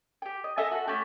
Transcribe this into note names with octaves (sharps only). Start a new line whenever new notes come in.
G4 G5
D#5
A4 D#5 E5 G#5
F#4 A4
A3 C#4 F#4 G4